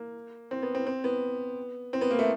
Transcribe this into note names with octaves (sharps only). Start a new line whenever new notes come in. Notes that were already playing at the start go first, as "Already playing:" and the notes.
Already playing: A#3
C4
B3
C4
C4
B3
C4
B3
A#3
A3